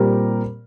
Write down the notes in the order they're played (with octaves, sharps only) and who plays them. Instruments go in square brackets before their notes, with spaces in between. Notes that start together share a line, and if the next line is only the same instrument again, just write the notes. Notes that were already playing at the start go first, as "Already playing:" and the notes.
Already playing: [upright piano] A#2 G3 C4 G4 A#4